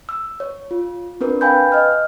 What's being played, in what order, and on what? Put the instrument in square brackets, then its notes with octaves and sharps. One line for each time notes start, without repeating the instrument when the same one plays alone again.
[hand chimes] E6
C#5
F4
C4 D4 A#4 B4
B4 F5 G5 G#5 B5 G6
D#5 F6